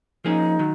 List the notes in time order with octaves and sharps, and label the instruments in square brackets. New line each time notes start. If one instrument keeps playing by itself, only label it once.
[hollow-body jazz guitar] F3 A#3 C#4 G#4 [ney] D#4
[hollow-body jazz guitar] D#3 F#3